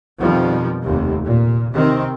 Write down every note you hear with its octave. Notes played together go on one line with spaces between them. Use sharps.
F2 B2 D#3 F3 G3
F1 D#2 C3
A#2
C3 D#3 C4